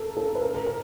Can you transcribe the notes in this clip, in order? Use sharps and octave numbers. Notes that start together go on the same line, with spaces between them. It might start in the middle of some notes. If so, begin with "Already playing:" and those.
Already playing: A4 A#4
A4
B4
A#4
A#4
A#4